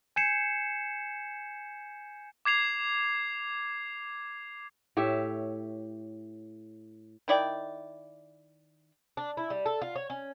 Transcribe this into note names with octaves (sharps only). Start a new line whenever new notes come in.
G#5 G6 G#6 C7 C#7 E7
D6 G#6 C7 F7
A2 G4 C#5 E5
D#3 E4 D5 G5
D4
E4
G3
A4
F4
C#5
C#4